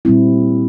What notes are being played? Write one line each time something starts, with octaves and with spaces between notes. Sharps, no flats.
A#2 G3 C4 E4